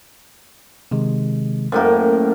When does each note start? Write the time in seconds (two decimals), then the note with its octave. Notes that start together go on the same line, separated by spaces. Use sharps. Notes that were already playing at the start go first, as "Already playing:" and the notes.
0.91 C3 D#3 G#3
1.72 F#2 A2 A#3 C5 G5